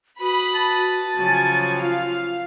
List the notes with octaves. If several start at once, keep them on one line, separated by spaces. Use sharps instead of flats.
F#4 B4 B5 D#6
A5
C#3 F3 F#3 G#5
F4 F5